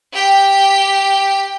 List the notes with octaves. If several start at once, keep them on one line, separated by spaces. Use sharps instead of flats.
G4 G5